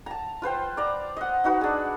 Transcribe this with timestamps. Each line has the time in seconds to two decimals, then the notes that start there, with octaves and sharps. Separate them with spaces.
0.06 A5 A#5
0.42 F4 B4 C5 G5
0.77 D5 A#5
1.17 D#5 F#5
1.44 D#4 F#4 B4
1.61 D4 G#4